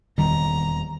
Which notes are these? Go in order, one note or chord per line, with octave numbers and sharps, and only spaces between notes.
D#1 E2 D#3 G3 A#5